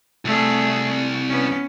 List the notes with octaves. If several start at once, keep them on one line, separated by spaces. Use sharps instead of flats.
C2 A3 G#4
B3 C#4